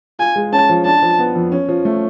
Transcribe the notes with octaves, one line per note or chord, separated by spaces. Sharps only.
F4 G#5
G#3
C#4 A5
F3
D4 A5
F3
B3
F2
C#4
F3
A3